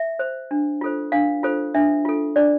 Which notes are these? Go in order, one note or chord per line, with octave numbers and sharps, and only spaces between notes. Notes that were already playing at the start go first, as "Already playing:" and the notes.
Already playing: E5
C5
D4
F4 A4 C5
D4 F5
F4 A4 C5
D4 E5
F4 A4
D4 D5